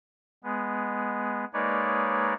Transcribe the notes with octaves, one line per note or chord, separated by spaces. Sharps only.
G#3 B3
G#3 A#3 D#4 B4 C#5 D5